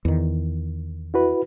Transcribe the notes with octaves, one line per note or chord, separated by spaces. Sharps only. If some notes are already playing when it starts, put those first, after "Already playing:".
E2 D#3
E4 F#4 B4